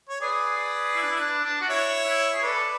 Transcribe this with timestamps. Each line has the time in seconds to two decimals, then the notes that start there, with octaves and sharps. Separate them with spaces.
0.10 C#5
0.21 G#4 B4 D5
0.58 G#4
0.96 E4
1.03 D4
1.10 E4
1.20 D4
1.44 D4
1.62 F#4
1.69 E4 C#5 E5
2.06 E4
2.34 G#4
2.43 A4 B4 D5